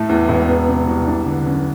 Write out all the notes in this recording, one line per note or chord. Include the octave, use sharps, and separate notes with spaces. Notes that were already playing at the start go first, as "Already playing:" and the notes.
Already playing: A2 A3
E2
E1
B3
C3
C2
D4
D3
F#2